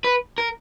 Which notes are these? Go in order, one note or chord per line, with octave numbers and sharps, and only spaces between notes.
B4
A#4